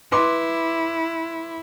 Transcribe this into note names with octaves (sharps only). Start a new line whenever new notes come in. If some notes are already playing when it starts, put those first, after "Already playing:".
E4 B4 C6 D6